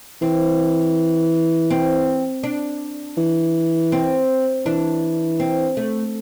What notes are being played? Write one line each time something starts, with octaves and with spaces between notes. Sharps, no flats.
E3 C4
C4
D4
E3
C4
E3 D4
C4
A3